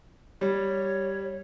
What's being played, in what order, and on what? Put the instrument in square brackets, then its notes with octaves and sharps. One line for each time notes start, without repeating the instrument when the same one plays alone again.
[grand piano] G3 [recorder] C#5